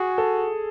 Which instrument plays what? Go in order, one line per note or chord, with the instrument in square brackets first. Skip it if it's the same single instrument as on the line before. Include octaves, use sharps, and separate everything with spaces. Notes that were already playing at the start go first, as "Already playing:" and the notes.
Already playing: [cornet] F#4 [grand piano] G#4
[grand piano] A4